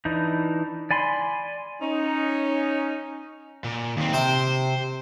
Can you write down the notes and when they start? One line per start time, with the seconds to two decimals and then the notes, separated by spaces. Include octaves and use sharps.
0.05 E3 D4 D#4
0.91 D5 G#5 B5 C6
1.81 C#4 D#4
3.64 A#2
3.97 D#2 C4
4.14 C3 C5 D6